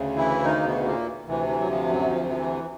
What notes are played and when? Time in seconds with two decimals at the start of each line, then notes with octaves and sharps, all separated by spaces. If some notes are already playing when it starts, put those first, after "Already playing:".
Already playing: D2 C#3
0.16 E3 E4
0.43 D#3 D#4
0.56 A#3
0.65 B2 B3
0.85 A#2 A#3
1.27 D2 C3 E3
1.47 E3
1.60 F#3
1.69 F3
1.89 F#2 F#3
2.09 F3
2.29 F3
2.37 E3